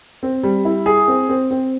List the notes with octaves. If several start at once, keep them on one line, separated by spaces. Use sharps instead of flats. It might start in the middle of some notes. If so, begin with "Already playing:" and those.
C4
G3
E4
G#4
C4
C4
C4